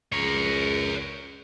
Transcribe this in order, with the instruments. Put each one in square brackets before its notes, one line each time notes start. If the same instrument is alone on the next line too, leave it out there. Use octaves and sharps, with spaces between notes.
[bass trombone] C#2 [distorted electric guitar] A#4 C#5